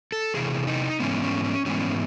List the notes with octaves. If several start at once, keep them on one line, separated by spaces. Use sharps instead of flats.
A4
E2 C3 E3 G#4
D#4
G#2 E3 G#3 B3 C#4
C#4
C#4
G#2 E3 G#3 B3 C#4